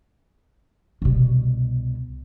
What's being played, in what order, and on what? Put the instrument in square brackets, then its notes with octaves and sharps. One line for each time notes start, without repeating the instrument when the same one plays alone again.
[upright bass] C2 B2